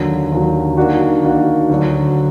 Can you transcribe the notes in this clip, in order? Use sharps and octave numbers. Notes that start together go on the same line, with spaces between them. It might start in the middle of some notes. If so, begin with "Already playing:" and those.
Already playing: D#2 D3 F#3
D#2 D3 F#3
D#3 A#3 D4 F#4
D#3 A#3 D4 F#4
D2 D3 F#3 D4 F#4